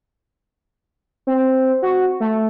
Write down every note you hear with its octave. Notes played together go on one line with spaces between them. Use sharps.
C4
F#4
A3